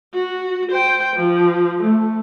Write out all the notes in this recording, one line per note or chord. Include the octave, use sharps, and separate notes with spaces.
F#4
C5 G5
F3
A3